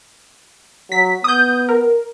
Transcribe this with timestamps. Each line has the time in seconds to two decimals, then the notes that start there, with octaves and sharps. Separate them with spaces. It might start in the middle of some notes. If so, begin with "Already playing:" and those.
0.92 F#3 B6
1.24 B3 D#6 G6
1.69 A#4